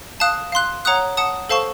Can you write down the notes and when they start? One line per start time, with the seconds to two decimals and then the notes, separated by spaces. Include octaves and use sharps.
0.20 F5 A5 D#6 F#6
0.52 F5 C6 F#6
0.85 C#5 F#5 A#5 D#6 F#6
1.17 F#5 A5 D#6
1.49 A4 C5 F5 A5 C#6